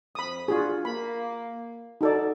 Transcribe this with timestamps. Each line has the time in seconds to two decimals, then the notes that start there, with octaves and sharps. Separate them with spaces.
0.15 F2 B5 D#6
0.48 D4 F4 F#4 G#4
0.85 A#3 B5
2.01 D#4 F#4 A4 D5